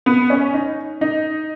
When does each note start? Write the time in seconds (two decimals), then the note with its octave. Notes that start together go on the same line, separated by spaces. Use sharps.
0.06 B3
0.30 C#4
0.54 D#4
1.01 D#4